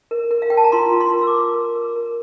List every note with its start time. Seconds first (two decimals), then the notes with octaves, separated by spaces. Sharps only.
0.11 A#4
0.31 A#4
0.42 F5
0.50 A#4 G5
0.57 A5
0.64 A#5
0.72 F4 C6
0.93 F4
1.00 C6
1.13 A#4
1.22 E6
1.27 D6
1.34 A#4
1.54 A#4
1.76 A#4
1.96 A#4